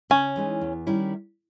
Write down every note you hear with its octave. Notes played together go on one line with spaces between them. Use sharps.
C#3 C#4
E3 G#3 D#4
E2
D#3 G3 C#4 E4